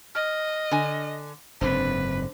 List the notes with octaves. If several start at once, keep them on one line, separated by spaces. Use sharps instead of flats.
D#5 F6
D3 G#5
F#1 G#2 D3 C4 B4 C5